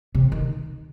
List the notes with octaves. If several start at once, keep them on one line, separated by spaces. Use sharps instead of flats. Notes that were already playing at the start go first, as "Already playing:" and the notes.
C3
D#3